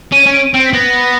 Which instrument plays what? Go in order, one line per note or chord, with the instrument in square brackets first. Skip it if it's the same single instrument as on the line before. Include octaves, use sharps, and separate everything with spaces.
[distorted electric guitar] C#4 [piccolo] D#7
[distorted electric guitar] C#4
[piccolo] D7
D#7
[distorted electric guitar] C4 [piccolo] D7
[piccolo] B6
[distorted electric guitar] B3 [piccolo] A#6